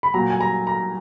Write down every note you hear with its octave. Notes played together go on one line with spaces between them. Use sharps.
B5
A#2 F#3 A#5
G#5
A#5
A#5